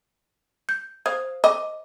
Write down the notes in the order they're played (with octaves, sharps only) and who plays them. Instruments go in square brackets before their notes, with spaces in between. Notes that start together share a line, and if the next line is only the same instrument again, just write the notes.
[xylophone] G6
[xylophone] C5 D#6 G#6 [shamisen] F5
[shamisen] D#5 [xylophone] D6